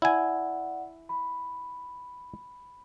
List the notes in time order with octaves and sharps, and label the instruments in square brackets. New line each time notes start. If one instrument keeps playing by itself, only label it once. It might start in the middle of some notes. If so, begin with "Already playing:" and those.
[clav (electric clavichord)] E4 G#5 [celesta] D5 F#5
[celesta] B5